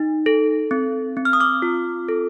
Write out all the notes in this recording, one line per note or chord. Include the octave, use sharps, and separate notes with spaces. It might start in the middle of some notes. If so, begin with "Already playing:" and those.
Already playing: D#4
A4
C4
C4
F6
D#6
D6 F6
F4
A4